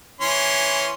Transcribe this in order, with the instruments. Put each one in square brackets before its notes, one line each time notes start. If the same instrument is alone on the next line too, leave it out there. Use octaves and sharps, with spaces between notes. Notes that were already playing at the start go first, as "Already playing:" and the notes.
[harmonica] E3 C#4 C6